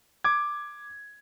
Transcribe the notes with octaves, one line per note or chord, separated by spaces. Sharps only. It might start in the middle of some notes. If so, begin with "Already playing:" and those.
D6 G#6